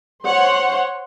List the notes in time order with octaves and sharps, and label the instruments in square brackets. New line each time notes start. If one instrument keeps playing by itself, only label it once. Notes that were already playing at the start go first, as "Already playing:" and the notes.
[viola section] C5 C#5 F#5 C6